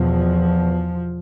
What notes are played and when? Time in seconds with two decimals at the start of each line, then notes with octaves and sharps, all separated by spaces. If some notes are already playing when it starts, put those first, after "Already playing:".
Already playing: E2 B2 F3